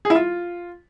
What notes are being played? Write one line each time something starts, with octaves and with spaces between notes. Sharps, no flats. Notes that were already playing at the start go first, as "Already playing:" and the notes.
G#4
E4
F4